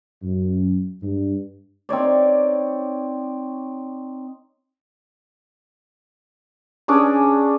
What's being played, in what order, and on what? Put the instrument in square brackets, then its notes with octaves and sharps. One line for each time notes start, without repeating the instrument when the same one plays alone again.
[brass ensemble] F#2
G2
[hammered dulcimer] C4 D#4 C#5 D5
C#4 D4 G#4 D6